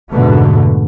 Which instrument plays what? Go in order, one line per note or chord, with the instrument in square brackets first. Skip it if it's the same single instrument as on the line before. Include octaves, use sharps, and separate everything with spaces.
[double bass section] F2 G#2 B2 D3 A3